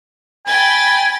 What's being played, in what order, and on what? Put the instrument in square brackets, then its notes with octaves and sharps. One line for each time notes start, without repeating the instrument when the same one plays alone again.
[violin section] G5 B5 A6 [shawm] G#5